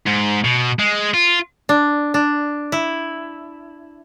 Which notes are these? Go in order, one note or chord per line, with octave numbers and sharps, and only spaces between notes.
G#2
B2
G#3
F4
D4
D4
E4